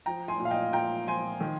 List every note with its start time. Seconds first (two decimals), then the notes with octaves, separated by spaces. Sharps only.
0.06 F3 G5 A#5
0.28 G#5 C6
0.40 A#2
0.45 F5
0.51 D#5 G5
0.73 A#2 G5 A#5
1.07 F3 G#5 C6
1.41 D#3